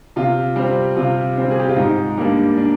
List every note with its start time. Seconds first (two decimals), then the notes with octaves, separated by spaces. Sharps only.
0.16 C3 F4
0.56 G3 C4
0.96 C3 F4
1.37 G3 C4
1.51 G#4
1.60 G4
1.68 F4
1.76 G#2 D#4
2.17 G3 A#3 D4
2.57 D4